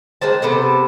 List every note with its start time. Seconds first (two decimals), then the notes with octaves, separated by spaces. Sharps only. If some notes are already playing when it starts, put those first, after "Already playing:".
0.22 D#3 G#3 C5 A5
0.42 C3 B3 A4 C5